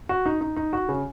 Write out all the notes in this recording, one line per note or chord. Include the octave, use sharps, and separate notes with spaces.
F#4
D#4
D#4
D#4
F#4
C#3